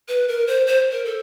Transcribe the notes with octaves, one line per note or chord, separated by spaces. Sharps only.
B4
A#4
C5
C5
A#4
A4